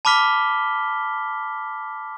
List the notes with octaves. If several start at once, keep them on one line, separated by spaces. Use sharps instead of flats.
A5 B5 D6 F6 B6 G7